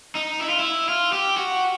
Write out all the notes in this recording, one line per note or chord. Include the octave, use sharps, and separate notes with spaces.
D#4
E4
F4
E4
F4
G4
F#4